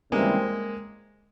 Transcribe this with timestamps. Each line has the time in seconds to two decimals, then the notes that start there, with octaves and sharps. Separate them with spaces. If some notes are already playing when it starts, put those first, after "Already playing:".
0.12 D#2 C#3 E3 G3 G#3 A#3 C4